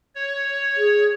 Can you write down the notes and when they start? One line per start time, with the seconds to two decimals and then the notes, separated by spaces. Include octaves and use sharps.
0.15 C#5
0.77 G#4